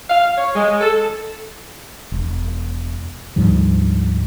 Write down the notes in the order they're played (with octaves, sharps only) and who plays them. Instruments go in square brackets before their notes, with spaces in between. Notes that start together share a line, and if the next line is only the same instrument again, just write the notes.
[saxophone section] F5
C#5
G#3
A4
[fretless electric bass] E1
D2 G#2 F3 G3